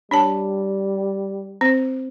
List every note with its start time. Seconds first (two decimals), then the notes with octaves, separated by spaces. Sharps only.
0.11 G3 D4 C#5 A5
1.61 C4 C5